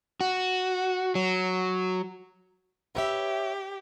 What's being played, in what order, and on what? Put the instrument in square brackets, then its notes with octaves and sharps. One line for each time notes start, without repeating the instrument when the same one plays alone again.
[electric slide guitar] F#4
F#3
[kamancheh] G4 [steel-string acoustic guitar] B4 C#5 E5